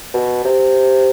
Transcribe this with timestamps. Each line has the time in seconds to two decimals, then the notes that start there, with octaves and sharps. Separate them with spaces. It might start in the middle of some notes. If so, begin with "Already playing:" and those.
0.14 B2
0.44 C3